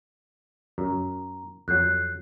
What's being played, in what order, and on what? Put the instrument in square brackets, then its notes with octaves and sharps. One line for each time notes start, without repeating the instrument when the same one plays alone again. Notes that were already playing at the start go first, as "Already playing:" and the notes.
[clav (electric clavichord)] F#2 [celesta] A#5
[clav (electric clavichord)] F2 F#3 [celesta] F#6 G6 C7